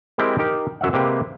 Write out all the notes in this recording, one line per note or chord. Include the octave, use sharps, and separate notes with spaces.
G#3 C4 E4 G4 A#4
D#4 G4 A#4
F#2 F#3 E5 F#5
C3 G#3 A#3 G4 B4